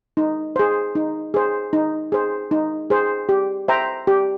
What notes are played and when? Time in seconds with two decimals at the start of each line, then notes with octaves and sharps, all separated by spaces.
0.17 D#4
0.56 G#4 C5
0.95 D#4
1.34 G#4 C5
1.73 D#4
2.12 G#4 C5
2.51 D#4
2.90 G#4 C5
3.29 G4
3.68 C5 E5 G5 A#5
4.07 G4